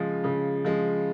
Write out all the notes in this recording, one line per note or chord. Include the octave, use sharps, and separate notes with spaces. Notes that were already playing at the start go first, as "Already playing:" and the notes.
Already playing: C#3 F3 G#3
C#3
F3 G#3